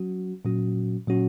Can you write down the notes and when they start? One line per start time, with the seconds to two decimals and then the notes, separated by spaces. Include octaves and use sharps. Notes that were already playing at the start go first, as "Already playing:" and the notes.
Already playing: F#3 C#4 F#4
0.45 A#2 F#3 C#4 F#4
1.08 A#2 F#3 C#4 F#4